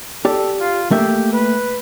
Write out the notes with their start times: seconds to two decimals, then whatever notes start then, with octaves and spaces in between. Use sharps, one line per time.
0.25 G4 A4 D5
0.60 F4
0.91 A3 A#3 G4 E5
1.33 B4